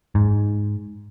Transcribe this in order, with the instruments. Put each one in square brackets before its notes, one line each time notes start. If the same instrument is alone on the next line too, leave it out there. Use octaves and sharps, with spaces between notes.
[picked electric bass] G#2